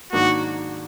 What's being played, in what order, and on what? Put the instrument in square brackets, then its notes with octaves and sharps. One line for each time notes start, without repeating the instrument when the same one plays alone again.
[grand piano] G#2 D#3 F#3 A#3 D4 [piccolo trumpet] F#4